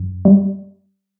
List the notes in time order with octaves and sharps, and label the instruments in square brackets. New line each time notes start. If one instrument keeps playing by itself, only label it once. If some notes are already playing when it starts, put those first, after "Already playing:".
Already playing: [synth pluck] F#2
G3